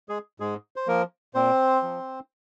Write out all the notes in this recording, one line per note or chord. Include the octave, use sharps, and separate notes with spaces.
G#3 G#4
G#2 G#3 G#4
C5
F3 A#3 A#4
A#2 C4 C5
F3